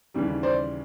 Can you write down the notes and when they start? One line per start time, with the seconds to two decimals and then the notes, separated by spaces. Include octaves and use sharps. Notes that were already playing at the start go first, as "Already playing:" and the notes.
0.14 D#2 C#3 E3 G3
0.43 C5 D5